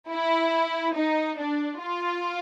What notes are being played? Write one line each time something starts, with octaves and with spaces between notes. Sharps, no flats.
E4
D#4
D4
F4